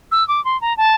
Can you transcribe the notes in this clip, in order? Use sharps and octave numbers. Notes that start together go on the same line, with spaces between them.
E6
D6
C6
A#5
A5